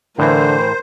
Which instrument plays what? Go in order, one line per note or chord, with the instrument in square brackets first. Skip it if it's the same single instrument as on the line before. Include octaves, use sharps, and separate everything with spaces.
[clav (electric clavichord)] A2 E3 [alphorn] D3 [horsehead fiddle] A#4 [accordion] C5